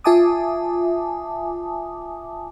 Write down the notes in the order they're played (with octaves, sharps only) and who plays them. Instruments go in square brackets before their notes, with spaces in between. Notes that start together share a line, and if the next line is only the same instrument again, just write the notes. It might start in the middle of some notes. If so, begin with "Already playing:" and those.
[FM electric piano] F4 E5 G#5 A5 D6 D#6